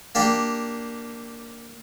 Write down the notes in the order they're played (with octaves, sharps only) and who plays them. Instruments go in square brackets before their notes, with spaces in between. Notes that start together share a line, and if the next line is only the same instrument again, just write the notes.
[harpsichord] A#3 D4 G4